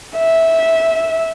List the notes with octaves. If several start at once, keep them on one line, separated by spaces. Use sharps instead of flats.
E5